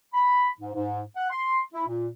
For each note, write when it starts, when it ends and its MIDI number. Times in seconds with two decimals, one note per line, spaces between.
0.14 0.49 83
0.59 0.73 44
0.74 1.01 44
1.16 1.28 78
1.30 1.60 84
1.74 1.83 64
1.87 2.08 46